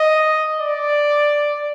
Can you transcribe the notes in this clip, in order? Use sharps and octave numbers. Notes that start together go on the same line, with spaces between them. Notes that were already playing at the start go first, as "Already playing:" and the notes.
Already playing: D#5
D5